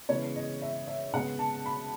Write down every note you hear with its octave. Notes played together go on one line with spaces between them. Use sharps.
C#3 E3 G#3 B3 C#5
D#5
E5
E5
C#3 G#3 B3 F#5
A5
B5